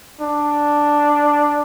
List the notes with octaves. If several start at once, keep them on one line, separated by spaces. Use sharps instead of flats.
D4